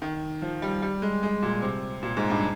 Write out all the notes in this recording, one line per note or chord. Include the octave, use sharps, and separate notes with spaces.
D#3
F3
G3
G3
G#3
G#3
A#2
C3
A#2
G#2
G2